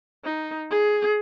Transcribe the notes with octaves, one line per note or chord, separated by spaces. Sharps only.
D#4
G#4